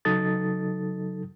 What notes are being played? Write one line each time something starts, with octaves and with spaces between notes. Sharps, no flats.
C#3 F#3 D#4 A4 D#6 A6